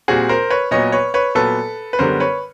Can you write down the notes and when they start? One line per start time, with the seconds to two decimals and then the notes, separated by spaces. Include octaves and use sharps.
0.08 A#2 G3 C4 F#4 G#4
0.29 A#4 C5
0.50 B4 C#5
0.71 A#2 F#3 B3 C#5 D#5
0.92 B4 C#5
1.14 B4 C#5
1.35 A#2 F#3 B3 A4 B4
1.93 B4
1.99 F#2 D3 G3 B3 A#4 C5
2.20 B4 C#5